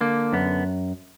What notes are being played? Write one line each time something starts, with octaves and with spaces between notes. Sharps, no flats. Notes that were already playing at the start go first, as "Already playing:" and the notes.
D3 A#3
F#2 B3